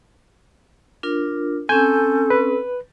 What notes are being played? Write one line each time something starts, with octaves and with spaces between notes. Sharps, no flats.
D4 F4 A#4
C4 C#4 A4 G#5 G6
B4